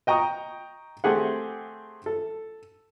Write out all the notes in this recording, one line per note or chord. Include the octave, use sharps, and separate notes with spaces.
D#5 G5 A#5 C#6 D#6
A3 C4 G4 G#4 F#5
A4